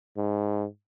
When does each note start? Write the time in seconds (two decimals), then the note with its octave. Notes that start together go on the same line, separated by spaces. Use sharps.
0.17 G#2